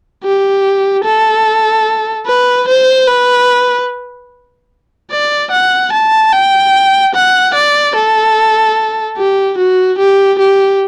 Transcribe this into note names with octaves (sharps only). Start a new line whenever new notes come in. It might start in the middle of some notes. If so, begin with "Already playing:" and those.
G4
A4
B4
C5
B4
D5
F#5
A5
G5
F#5
D5
A4
G4
F#4
G4
G4